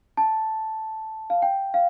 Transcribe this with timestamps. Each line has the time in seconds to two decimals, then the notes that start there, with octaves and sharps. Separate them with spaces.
0.17 A5
1.30 F5
1.42 G5
1.74 F5